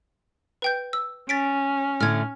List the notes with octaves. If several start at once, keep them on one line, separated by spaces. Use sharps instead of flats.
B4 G5 G6
E6
C#4 A6 B6 D7
A2 D3 F6 G#6